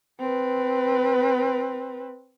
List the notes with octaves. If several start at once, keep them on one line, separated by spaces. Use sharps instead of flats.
C4 B4